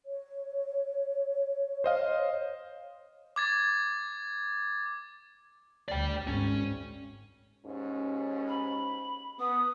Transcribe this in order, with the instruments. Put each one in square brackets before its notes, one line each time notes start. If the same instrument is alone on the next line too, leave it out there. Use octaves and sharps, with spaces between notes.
[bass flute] C#5
[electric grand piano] C5 D#5 F5
[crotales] D6 G#6 A6
[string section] D2 [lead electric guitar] D5 G5
[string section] G#1 [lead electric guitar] C#4
[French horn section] D#2 G#2 C#4
[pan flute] B5
[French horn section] B3 [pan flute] D#6